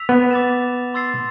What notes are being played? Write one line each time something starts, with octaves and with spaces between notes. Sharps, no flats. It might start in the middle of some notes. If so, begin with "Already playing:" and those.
Already playing: E6 B6 F7
B3
D6 A6 E7
C6 E6 A6 C7